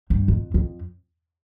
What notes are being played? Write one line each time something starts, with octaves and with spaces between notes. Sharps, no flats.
G2
F2
F2